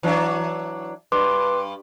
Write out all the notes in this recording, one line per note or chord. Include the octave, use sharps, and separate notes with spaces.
E3 F#3 D4
G2 B4 C6 D6